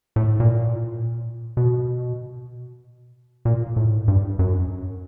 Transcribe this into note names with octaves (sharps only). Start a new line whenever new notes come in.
A2
A#2
B2
A#2
A2
G2
F#2